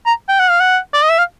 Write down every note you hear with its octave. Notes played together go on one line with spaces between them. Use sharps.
A#5
G5
F#5
F5
F#5
D5
D#5
E5
F5